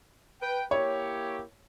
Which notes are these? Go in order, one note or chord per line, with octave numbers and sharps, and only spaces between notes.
B4 G5
A#3 E4 G4 C#5